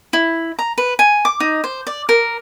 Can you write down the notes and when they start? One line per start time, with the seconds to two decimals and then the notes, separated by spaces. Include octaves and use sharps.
0.13 E4
0.59 A#5
0.78 B4
0.99 G#5
1.25 D6
1.40 D#4
1.64 C5
1.87 D5
2.09 A#4